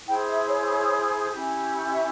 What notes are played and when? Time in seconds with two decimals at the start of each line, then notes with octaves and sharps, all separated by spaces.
0.06 E4 G#4 C5 G5
0.27 E5
0.48 C#5
1.29 C#4 E4 G4
1.90 E5